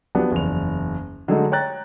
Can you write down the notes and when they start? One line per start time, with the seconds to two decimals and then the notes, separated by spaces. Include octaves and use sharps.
0.15 F3 F#3 B3 D4 G4
0.32 F#1 E2 F7
1.28 D3 F#3 G#3 A3 D#4
1.52 C#5 G5 A#5 F#6 A6